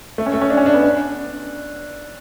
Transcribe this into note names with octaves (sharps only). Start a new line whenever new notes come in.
A3
C#4
A3
C#4
D4
C#4
D4
B3
D4